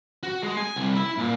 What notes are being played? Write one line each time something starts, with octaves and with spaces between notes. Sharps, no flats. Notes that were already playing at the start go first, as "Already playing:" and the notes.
F#4
G#3
G#5
C2
E4
A#2